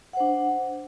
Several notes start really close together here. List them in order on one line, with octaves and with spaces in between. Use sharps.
F#5 C5 D4